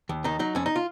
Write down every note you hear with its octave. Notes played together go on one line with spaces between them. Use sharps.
D#2
D#3 D#4
F#3 D#4
F2 C#4
D#4
F4